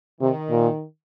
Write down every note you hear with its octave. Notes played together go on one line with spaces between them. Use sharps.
C3 D#3
A#2